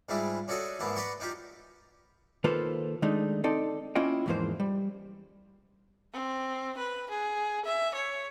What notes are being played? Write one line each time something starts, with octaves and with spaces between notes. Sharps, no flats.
G#2 G3 G#3 D4 E4 F4
C#4 D4 F#4 A4 D5 D#5
G#2 A#3 B3 D4 E4
B4 D5 F#5 A#5 C6 C#6
D4 D#4 F4 G4
D#3 A#3 F4 A4 B4 C5
D#3 G#3 A3 D4 D#4
C4 D#4 A4 D5
A#3 C#4 E4 F4 D#5 G5
E2 G#2 E3 F3 A#3 C5
G3
C4
B4
G#4
E5
C#5